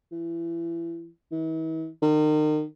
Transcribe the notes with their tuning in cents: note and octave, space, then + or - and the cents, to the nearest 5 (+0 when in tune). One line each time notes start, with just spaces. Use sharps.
E3 +30
E3 -45
D#3 -35